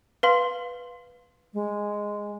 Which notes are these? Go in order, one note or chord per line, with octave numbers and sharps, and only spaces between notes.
B4 F5 C6
G#3